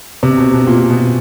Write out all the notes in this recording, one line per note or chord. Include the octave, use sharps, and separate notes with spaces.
C3
B2
B2
A#2
B2